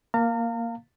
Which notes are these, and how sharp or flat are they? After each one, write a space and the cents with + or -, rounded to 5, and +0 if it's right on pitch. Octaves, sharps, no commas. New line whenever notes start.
A#3 +0 F5 +0 A#5 -40